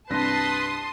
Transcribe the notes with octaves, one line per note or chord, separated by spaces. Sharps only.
C2 G2 B4 A5 C6 D#6 A#6